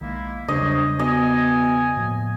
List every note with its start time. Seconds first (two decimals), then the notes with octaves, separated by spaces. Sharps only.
0.01 B1 D#3 G#3 A#3 E4
0.48 E2 G2 C#3 F#3 C5 C#5 D#5
0.99 B2 D#5 G#5
1.97 A2 F3 A#3